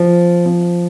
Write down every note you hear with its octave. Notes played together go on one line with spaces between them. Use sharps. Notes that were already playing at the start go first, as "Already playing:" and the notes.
Already playing: F3
F3